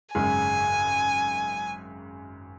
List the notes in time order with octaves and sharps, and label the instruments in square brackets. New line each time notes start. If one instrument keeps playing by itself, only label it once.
[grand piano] G#1 F#2 C#3 G#3 [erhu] G#5